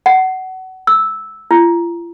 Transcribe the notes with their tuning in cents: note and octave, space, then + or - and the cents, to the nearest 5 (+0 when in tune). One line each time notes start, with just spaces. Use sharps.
F#5 +25
E6 -10
F4 -40